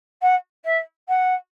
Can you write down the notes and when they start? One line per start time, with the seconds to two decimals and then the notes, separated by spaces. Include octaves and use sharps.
0.21 F#5
0.64 E5
1.08 F#5